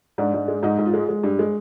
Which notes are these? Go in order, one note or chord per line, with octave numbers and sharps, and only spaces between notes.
G#2 D4
G#2
G#3
G#2 D#4
G#2
F4
G#3
G#3
G2
G#3